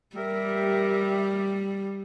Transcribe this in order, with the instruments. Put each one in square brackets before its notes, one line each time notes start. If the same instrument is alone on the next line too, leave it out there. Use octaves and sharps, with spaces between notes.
[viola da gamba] G3 [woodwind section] G4 A#4 E5